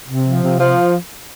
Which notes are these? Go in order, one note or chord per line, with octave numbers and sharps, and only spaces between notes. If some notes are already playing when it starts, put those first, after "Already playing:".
C3
F3
C3
F3